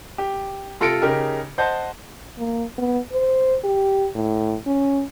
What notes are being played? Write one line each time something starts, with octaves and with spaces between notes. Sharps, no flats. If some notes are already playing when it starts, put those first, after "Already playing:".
G4
C3 F4 A4 A#6 C#7 D7
C#3 D#4 G4 A#4
C5 D#5 F#5 A5 G6
A#3
B3
C5
G4
A2
C#4